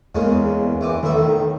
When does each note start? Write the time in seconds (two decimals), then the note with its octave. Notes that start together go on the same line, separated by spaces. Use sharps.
0.15 E2 C#3 G#3 A#3
0.81 A#1 E3 D6
1.03 B1 A2 D#3 E5